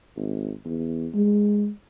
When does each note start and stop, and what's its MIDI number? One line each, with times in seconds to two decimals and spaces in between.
0.17 0.51 32
0.65 1.08 40
1.14 1.69 56